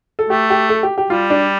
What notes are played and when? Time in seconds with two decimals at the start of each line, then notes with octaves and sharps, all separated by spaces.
0.19 A4
0.29 A3 G4
0.50 G4
0.69 A4
0.83 G4
0.98 G4
1.10 G3 F4
1.30 D4